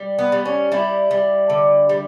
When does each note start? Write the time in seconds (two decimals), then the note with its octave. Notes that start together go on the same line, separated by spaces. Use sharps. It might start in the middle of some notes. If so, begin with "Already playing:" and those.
Already playing: G3
0.19 B3
0.32 G3
0.45 C#4
0.72 G3 E4
1.11 G3
1.50 D3
1.89 G3